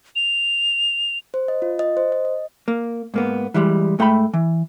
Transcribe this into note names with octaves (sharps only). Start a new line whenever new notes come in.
F7
C5
D#5
F4
D#5
C5
D#5
D#5
A#3
G#2 A#3 B3
E3 F3 G3 G#3
G#2 A3 G5 A#5 B5
E3